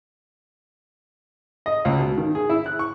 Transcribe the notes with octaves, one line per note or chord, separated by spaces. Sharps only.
D#5
C#2
B2
D#3
G#4
E4
F#6
C#6